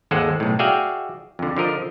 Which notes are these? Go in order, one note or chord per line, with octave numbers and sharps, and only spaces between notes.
G#1 D#2 G#3 A4 C5 F#5
B1 A2
F#4 G#4 D5 E5 F5 G5
F2 D3
D3 F3 A#4 D#5